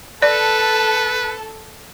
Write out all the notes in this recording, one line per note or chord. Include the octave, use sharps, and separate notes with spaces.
A4 B4 D5